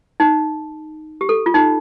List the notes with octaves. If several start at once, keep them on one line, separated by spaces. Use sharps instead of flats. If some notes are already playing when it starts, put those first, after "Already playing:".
D#4
G4
A4
F4
D#4